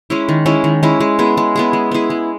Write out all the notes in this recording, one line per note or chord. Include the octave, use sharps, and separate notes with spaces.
G#3 C#4 E4
D#3
G#3 C#4 E4
D#3
G#3 C#4 E4
G#3
B3 E4 G#4
G#3
B3 E4 G#4
G#3
B3 E4 G#4
G#3